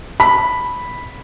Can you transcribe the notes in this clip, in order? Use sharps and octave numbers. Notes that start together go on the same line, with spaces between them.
B5